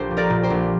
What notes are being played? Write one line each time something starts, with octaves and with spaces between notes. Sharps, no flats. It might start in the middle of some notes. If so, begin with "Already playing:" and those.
Already playing: A#1 G4 C5
A#2
A#4 D5
A#2
G4 C5
A#1